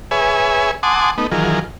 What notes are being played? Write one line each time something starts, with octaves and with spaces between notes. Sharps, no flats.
G#4 B4 C#5 E5 G#5
F#5 G#5 A5 C6 D6 D#6
A3 B3 D#4
D#3 E3 F#3 F4 G#4 A#4